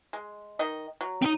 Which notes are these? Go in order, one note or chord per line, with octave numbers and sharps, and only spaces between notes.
G#3
D#3 D#5
F#3
C4 D#4